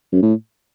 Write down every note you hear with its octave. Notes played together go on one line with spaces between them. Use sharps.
F#2
A2